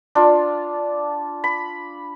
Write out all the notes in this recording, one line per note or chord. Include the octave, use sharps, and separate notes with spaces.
D4 F4
B5